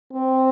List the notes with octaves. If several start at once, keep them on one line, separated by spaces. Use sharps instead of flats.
C4